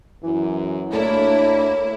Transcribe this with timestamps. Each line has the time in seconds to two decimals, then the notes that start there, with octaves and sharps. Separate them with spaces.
0.23 F#2 E3
0.92 D2 A#3 D4 E4 A4 C#5 A#5